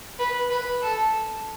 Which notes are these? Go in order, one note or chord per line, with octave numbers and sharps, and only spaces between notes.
B4
B4
A4